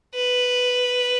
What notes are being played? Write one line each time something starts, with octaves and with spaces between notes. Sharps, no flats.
B4